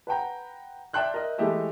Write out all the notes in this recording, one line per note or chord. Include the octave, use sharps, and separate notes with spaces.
B4 F#5 G5 A#5
D5 E5 G5 C6 F#6 G6
A#4 D#5 E5
E3 G#3 A3 G4 D#5 E5